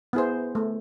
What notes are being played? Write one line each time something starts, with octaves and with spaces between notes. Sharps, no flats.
B3 E4 G#4 C5
A3